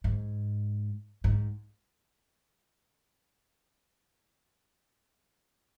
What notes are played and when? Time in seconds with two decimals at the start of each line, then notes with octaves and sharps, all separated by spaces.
0.04 G#2
1.24 G#2